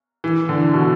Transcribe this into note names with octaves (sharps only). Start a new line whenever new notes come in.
E3
D3
B2